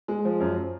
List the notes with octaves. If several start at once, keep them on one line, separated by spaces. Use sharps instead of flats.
G#3
F3
F#2